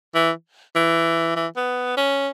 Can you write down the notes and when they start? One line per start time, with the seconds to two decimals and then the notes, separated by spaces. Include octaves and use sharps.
0.15 E3
0.75 E3
1.36 E3
1.56 B3
1.97 C#4